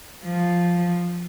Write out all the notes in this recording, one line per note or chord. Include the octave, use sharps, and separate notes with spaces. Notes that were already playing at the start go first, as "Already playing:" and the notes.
F3